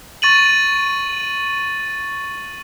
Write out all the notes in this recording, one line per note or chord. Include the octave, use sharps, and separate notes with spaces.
C#6 A6 D#7 F#7